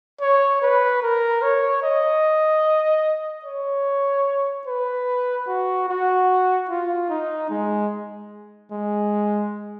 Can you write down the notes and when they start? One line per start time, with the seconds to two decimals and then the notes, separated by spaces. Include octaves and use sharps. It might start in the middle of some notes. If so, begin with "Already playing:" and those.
0.21 C#5
0.62 B4
1.02 A#4
1.42 C#5
1.83 D#5
3.45 C#5
4.67 B4
5.47 F#4
5.89 F#4
6.69 F4
7.09 D#4
7.50 G#3
8.71 G#3